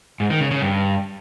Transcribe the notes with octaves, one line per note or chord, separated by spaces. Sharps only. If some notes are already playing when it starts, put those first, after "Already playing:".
G#2
D#3
C#3
C#3
G2